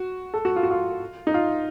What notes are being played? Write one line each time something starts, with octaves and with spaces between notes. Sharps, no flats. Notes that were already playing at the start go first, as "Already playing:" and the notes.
Already playing: F#4
A4
F#4
F4
F#4
F4
D#4
F4